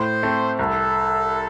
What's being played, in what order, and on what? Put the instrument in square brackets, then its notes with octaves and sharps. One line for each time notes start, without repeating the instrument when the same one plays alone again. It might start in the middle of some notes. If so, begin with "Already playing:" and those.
Already playing: [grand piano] A2 [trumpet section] C5
[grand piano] A3 C4
[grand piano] C2 [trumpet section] A4